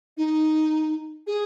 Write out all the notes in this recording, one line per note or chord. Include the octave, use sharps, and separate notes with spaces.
D#4
G#4